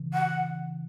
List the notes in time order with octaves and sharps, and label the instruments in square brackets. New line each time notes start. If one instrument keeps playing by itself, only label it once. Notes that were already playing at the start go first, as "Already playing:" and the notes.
Already playing: [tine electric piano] C#3 E3
[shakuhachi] F#5